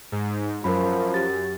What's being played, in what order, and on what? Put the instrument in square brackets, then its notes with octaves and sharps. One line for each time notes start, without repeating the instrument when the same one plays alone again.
[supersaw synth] G#2
[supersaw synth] F#2 [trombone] F3 [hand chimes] A#4 B5
[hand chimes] G4 A6